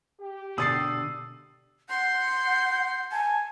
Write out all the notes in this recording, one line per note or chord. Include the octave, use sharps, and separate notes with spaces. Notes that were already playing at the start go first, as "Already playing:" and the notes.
G4
B2 D3 D4 D#6 E6 A6 C7
F#5 C6 G6
G#5 A5